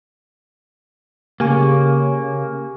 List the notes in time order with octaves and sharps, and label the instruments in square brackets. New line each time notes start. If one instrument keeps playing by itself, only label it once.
[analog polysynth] C#3 [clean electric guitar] A#3 [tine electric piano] G4 G#5 C#6